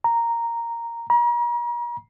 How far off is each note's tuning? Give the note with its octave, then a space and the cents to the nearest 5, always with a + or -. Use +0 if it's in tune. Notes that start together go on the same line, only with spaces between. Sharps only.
A#5 -5
A#5 +40